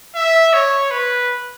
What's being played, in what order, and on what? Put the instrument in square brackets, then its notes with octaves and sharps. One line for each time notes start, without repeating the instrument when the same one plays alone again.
[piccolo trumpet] E5
C#5
B4